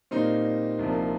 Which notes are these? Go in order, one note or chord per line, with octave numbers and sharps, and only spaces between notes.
A#2 G3 A#3 C4 D#4
C2 C3 F3 A#3